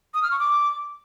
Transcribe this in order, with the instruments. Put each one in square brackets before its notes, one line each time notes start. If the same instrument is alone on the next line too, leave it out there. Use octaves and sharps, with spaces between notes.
[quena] D#6
F6
C#6
D6